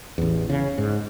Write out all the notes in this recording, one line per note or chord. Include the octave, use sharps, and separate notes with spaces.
A1 E2
C#3
G#2